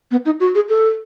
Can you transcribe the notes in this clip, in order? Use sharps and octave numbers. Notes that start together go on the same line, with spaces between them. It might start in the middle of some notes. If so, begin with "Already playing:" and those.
B3
D#4
F#4
G#4
A4